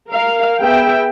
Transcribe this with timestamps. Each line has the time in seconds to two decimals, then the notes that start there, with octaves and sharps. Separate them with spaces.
0.10 A#4 F5
0.60 B3 G#4 E5 G5